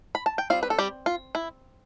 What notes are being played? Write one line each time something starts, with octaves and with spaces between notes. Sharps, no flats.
B5
A5
G5
G3 C4 F4 F5
B4
A4
G3 G4
F4
E4